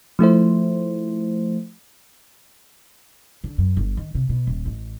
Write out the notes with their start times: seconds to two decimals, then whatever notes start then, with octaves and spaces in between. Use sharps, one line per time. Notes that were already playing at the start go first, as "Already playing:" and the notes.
0.19 F3 A3 E4 C5
3.44 D3
3.58 F#2
3.77 G1
3.97 D#3
4.15 C3
4.29 B2
4.47 D#1
4.65 A1